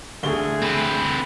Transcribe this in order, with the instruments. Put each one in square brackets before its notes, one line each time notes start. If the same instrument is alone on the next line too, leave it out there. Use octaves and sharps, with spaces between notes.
[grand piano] D2 G7 [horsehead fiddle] A3 G#4
[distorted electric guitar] C4 B4